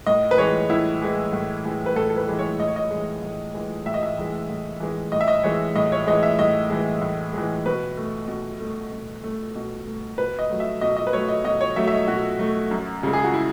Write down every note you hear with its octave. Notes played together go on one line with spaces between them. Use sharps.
A2 D#5
B4
E3 G#3 C#5
A2 E4
E3 G#3
A2
E3 G#3
B4
A2 A4
A4
B4
E3 G#3
C#5
A2 D#5
C#5
D#5
E3 G#3
A2
E3 G#3
A2 E5
D#5
E5
E3 G#3
A2
E3 G#3
A2 D#5
E5
D#5
E3 G#3 C#5
A2 D#5
C#5
E3 G#3 D#5
E5
A2 D#5
E3 G#3
A2
E3 G#3
B2 B4
A3
B2
A3
B2
A3
B2
A3
B2 B4
D#5
F#3 A3
E5
B2 D#5
D#5
B4
F#3 A3 C#5
D#5
B2 D#5
C#5
F#3 A3 E5
E5
D#5
B2 F#4
F#3 A3
F#2
C#3 G#3
G#4
F#4
E4